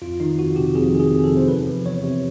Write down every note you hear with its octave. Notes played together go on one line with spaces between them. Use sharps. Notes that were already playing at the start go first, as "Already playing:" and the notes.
F2 F4
D#3 D#4
F2 F#4
C3 G4
F2 G#4
D#3
G#4
F2
A4
C3
C5
E2 B4
F3
E2 C#5
C3